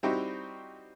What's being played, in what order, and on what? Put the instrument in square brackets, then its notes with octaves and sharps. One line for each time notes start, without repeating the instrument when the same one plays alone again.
[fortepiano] G3 C4 D#4 E4 F#4 G4